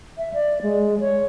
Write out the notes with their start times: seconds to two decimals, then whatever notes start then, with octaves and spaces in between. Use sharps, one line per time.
0.18 E5
0.34 D5
0.62 G#3
1.00 C#5